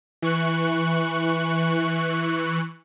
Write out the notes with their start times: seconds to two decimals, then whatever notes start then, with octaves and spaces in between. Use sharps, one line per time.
0.22 E3 C#6 F#6